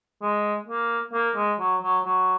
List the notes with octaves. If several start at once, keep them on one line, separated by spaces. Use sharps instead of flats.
G#3
A#3
A#3
G#3
F#3
F#3
F#3